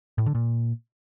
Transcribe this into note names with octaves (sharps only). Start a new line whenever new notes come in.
A2
D3
A#2